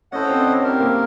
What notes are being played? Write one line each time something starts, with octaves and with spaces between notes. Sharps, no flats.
C#4 E4 A4 C5 D#5 F#5
C4
D4
C#4
C4 E4 G4 A#4
A#3